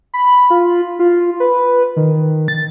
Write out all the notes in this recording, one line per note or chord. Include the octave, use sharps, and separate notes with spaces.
B5
F4
F4
B4
D#3
A6